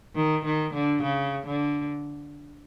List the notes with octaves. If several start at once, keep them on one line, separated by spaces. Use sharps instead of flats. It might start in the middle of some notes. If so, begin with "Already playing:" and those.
D#3
D#3
D3
C#3
D3